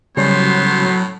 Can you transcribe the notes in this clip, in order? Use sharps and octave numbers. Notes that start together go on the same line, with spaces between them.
A2 C#3 F#3 G3 B3 C#4 C5 C6